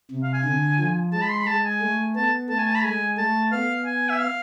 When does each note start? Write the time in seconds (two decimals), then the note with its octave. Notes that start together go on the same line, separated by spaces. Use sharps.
0.11 C3
0.23 F5
0.34 G#5
0.45 D3
0.80 F3
1.13 G#3 A5
1.22 B5
1.30 C6
1.39 B5
1.47 G#3 A5
1.65 G#5
1.81 A3
2.16 B3 A5
2.49 A3 A5
2.58 G#5
2.67 A5
2.75 B5
2.84 G#3 G#5
3.18 A3 A5
3.52 B3 F5
3.86 G#5
4.09 E5
4.20 F5